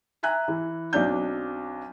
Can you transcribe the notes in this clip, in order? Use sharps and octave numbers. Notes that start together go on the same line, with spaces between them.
E5 G#5 A#5 F#6
E3
B1 C4 D4 G6